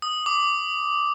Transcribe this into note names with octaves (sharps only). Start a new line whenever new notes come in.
D#6
D6